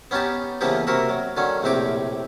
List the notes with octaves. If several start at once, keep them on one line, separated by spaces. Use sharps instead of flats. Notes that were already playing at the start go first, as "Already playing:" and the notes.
B3 C#4 D#4 G4 A5
C#3 E3 F3 A#3 B3 G4
C3 A#3 F#4 A#4 E5
F#3
D3 D#3 F#3 C#4
A#1 A2 C3 C4 G4 D6